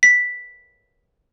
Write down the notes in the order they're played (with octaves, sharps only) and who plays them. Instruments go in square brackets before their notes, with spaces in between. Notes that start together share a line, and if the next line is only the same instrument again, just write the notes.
[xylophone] B6